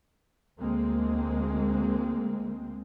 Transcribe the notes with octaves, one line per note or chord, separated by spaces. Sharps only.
D2 G#3 A#3 C4